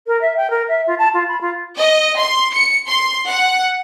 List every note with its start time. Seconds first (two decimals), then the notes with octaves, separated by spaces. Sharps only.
0.07 A#4
0.21 E5
0.37 G5
0.50 A#4
0.68 E5
0.87 F4
0.99 A5
1.14 F4
1.28 B5
1.41 F4
1.77 D#5
2.18 C6
2.54 C#7
2.87 C6
3.28 F#5